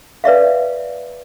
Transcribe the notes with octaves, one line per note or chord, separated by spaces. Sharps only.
B4 D5 E5 F5